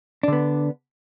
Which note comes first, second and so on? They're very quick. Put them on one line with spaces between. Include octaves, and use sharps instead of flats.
D4 D3 B3